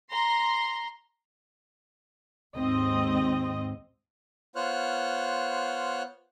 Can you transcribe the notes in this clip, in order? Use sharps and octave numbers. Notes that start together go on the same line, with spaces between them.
A#5 C6
D#2 G#2 C4 D#5
B3 F4 C5 C#5 F6 F#6